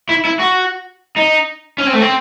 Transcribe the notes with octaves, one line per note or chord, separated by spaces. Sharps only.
E4
E4
F#4
D#4
C#4
C4
A3
C4